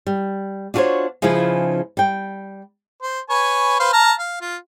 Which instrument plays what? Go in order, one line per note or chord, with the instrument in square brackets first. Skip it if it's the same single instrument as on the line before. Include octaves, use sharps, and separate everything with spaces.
[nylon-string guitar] G3
D4 F4 F#4 A4 C5 C#5
C#3 F3 D#4 E4 G#4 B4
G3 G5
[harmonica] C5
B4 C#5 G#5
B4 C5 F5
A5 A#5 F6
F5
F4